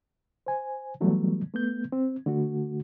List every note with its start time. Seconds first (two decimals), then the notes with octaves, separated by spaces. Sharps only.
0.46 C5 G#5
1.01 E3 F#3 G3 A3 B3
1.54 A3 B3 G6
1.92 C4
2.26 D3 A3 F#4